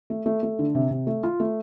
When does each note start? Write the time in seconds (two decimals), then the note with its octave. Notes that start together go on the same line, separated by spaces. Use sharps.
0.10 A3
0.26 A3
0.43 A3
0.59 D3
0.75 C3
0.91 C3
1.07 A3
1.23 F4
1.40 A3